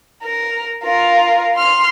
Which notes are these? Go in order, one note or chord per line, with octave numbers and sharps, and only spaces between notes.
A#4
F4 A#4
C6 F6